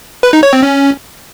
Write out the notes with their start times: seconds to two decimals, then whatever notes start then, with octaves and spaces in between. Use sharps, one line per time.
0.23 B4
0.33 D#4
0.43 C#5
0.53 C4
0.63 C#4